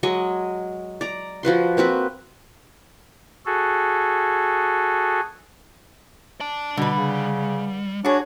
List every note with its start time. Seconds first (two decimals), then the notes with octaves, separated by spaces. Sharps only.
0.03 F#3 G#3 D#5 C#6
1.01 D5 A#5
1.43 F3 F#4 B4 C6
1.77 A#3 C4 F#4 B4
3.46 F#4 G#4 A4
6.40 D5 A5
6.77 B2 D3 G3 B4
6.96 C#3
8.04 D4 F#4 G#4 C#5